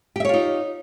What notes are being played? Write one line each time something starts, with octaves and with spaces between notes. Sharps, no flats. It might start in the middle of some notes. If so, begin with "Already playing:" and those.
D#4 F4 G4 C#5 E5